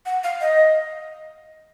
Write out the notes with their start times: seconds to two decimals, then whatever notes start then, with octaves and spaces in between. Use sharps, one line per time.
0.06 F#5
0.24 F5
0.41 D#5